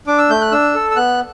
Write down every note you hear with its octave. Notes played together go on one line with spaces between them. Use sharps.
D4 D6
E6
A3 G6
F#6
D4 E6
A4
E6
B3 F#6